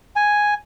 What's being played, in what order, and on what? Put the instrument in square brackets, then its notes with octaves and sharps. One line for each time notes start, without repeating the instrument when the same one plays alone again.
[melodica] G#5